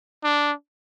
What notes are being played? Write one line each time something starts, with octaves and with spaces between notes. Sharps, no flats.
D4